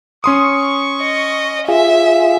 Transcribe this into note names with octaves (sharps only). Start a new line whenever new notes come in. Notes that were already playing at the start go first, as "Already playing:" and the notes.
C#4 C6 C#6 D#6
D#5
F4 G#4 E5